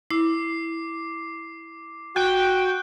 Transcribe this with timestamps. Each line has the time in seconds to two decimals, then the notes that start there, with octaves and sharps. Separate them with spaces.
0.11 E4 D6 C7
2.16 F#4 G5 F#6